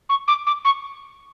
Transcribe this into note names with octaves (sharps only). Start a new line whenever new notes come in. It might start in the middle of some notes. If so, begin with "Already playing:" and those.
C#6
D6
D6
C#6